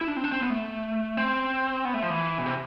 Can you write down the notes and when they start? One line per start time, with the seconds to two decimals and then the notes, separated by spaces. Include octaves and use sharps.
0.01 E4
0.08 D4
0.16 C4
0.24 D4
0.32 C4
0.41 B3
0.50 A3
1.17 C4
1.85 B3
1.94 A3
2.02 F3
2.10 E3
2.38 B2
2.46 C3